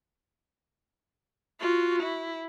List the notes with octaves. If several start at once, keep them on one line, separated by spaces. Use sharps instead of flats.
F4 F#4
E4